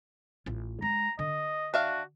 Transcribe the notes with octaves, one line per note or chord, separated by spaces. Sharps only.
A1 F4
G#3 A#5
D3 D#5
D4 F#4 E5 F5